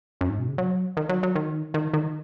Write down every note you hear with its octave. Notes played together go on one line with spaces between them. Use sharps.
F#2
G#2
B2
C#3
F#3
D#3
F#3
F#3
D#3
D#3
D#3